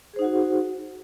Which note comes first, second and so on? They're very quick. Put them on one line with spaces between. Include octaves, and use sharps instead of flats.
G#4 C5 D#4 F#5 F#4